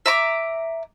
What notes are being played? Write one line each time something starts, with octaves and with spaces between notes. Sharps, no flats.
E5 A#5 D6